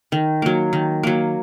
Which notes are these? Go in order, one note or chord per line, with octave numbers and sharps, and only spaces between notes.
D#3
F#3 A#3
D#3
F#3 A#3